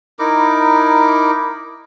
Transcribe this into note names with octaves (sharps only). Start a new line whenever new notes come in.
D#4 E4 A#4 D6